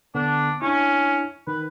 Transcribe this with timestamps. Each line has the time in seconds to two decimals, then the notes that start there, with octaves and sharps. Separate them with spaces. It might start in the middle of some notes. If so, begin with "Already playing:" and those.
0.15 D3 B3 D4
0.62 C#4 D4 E4
1.47 D#3 B4